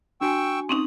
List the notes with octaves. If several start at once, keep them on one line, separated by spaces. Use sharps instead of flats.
D4 F#4 G5 G#5 C#6 E6
C4 C#4 D#4 D#6 F#7